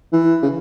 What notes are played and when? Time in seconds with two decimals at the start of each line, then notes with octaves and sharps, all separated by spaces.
0.12 E3
0.42 C#3